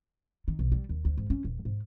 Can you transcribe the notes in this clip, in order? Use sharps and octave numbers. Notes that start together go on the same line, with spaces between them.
D#3
B1
G3
D#2
D2
G#2
C#4
D#1
G#2